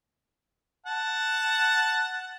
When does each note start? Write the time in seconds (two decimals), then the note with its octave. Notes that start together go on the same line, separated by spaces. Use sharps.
0.87 F#5 A5